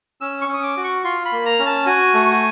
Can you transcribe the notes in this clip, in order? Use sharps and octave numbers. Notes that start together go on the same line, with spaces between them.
C#4 E6
C#6
C#4
D#6
D6
F#4
C#6
F4 C6
B5
A#3
A#5
C#4
A5
F#4 G#5
A3